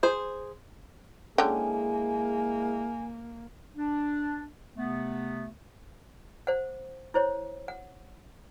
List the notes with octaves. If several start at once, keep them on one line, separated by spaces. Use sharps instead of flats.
G#4 C5
D3 G#3 A#3 C#4 E4 G#4 G5 G#5
D4
C3 A3 B3
C5 F#5
E4 C5 C#5
F#5